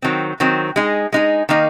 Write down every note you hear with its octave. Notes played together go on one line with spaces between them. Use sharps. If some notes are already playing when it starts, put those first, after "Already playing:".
D#3 F#3 C4
D#3 F#3 C4
G#3 D#4 G#4
G#3 D#4 G#4
D#3 A#3 D#4